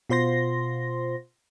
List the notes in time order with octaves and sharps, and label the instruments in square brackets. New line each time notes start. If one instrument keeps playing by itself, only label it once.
[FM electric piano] B2 F4 C5 C6 A#6